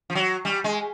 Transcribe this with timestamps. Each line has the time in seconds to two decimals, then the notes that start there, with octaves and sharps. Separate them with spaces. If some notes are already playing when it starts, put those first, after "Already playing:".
0.10 F3
0.15 F#3
0.45 G3
0.64 G#3